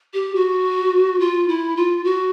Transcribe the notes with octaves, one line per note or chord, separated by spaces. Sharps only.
G4
F#4
F4
E4
F4
F#4